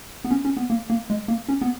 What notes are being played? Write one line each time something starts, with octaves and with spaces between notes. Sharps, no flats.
B3
C#4
C#4
B3
A#3
A#3
G#3
A#3
C#4
B3